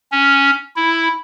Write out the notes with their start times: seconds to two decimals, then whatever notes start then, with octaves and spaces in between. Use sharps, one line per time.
0.12 C#4
0.76 E4